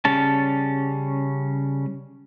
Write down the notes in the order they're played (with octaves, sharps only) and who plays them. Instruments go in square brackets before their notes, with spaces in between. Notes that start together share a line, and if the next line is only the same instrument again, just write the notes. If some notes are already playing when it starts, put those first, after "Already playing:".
[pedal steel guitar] C#3 G3 C#4 A5